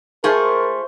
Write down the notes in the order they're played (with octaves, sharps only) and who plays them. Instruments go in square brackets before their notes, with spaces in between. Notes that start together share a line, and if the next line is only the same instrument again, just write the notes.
[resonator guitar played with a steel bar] A3 F4 G#4 [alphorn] A#4 [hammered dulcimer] C5 C#6